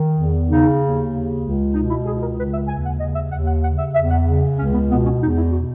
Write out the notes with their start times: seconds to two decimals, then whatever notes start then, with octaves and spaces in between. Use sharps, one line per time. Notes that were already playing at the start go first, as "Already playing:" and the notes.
Already playing: D#3
0.16 E2
0.47 C#3 D#4
0.79 D#2
1.10 C#3
1.42 C#2
1.74 B2 D#4
1.90 E4
2.05 C#2 G#4
2.22 A#4
2.37 C#3 B4
2.52 E5
2.68 D#2 G#5
2.85 F#5
2.99 C#3 D#5
3.15 E5
3.31 D#2 F#5
3.47 F#5
3.63 C#3 F#5
3.78 E5
3.94 E2 E5
4.10 F#5
4.27 C#3
4.57 C#2 C#4
4.73 B3
4.89 B2 B3
5.05 C#4
5.20 E2 D#4
5.37 E4
5.52 B2 F#4